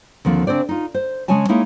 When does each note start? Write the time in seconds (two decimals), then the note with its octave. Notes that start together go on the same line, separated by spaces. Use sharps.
0.25 D#2 D3 F3 C4
0.47 C#3 C4 D4 C5 D5
0.69 D#4 F4
0.94 C5
1.28 C#3 G#3 C#4 C#5 G#5 A5
1.48 G#3 A#3 D#4 E4 G#4 C#5